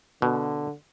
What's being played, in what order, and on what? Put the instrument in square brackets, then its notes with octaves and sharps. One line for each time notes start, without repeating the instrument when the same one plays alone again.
[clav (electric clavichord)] B2 [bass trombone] D3